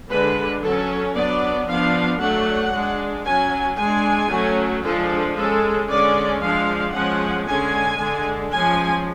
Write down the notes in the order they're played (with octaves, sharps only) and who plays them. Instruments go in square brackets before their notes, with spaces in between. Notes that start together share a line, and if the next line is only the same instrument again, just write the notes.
[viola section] D3 G#3 D4 B4
F#3 C#4 A4
F#3 B3 D4 D5
F3 B3 D4 F5
F#3 A3 D4 F#5
G#3 D4
F#3 C#4 G#5
G#3 D4 G#5
F#3 A3 C#4
F3 G#3 D4 A4
G#3 C#4 A4
D3 G#3 C#4 D5
F3 G#3 D4 F5
F3 G#3 C#4 F#5
D3 G#3 C#4 G#5
D3 G#3 D4
F3 G#3 C#4 G#5